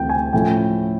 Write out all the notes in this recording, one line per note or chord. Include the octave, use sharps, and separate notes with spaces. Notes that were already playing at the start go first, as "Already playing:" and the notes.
Already playing: D2 C3 E3 A3 G5
G#5
A2 F3 A3 C#4 E4 G5